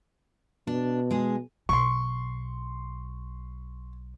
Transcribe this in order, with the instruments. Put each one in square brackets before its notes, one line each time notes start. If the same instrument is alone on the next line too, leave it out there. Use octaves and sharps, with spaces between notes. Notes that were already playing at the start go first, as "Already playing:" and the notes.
[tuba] B2 [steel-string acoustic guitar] D4
[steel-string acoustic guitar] G#3 G#4
[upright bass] B1 [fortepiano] C6 C#6